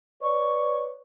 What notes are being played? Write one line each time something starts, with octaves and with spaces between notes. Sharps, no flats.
B4 C#5 D5 C#6